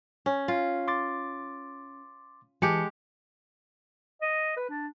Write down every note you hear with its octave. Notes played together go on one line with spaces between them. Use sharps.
C#4
F4
C6 D6 A6
E3 G#3 G4 A5 C#7
D#5
B4
D4